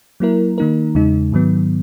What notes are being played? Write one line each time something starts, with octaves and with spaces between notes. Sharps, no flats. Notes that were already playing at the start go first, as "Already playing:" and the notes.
F#3 A#3 E4 A#4
D#3 A#3 D#4 A#4
E2 C#3 G#3 D#4
G#2 D#3 F#3 B3